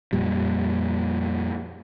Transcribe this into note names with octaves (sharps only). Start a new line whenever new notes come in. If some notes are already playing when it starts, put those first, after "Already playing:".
F2 A#2 G3